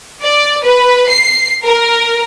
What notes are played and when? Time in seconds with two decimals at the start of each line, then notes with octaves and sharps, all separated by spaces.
0.22 D5
0.64 B4
1.09 C7
1.65 A#4